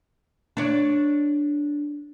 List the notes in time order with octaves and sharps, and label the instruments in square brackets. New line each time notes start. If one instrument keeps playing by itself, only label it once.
[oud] D4 C#5 D5